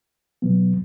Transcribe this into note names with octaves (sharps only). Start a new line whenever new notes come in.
B2 F#3 B3